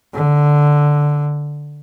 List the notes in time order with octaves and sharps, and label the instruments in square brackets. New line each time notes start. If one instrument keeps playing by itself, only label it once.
[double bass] D3